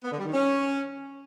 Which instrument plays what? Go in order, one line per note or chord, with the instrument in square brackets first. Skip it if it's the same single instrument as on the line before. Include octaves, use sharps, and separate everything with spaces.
[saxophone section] B3
D3
G3
D#3
C#4